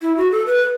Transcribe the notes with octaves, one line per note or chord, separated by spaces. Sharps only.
E4
F#4
A4
B4